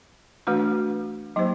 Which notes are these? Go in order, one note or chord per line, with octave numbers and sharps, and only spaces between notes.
E3 A3 D4 F#4 B4
F#3 A#3 D#4 G4 C5